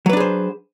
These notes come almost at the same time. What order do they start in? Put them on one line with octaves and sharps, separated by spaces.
F#3 B4 D4 G#4 C5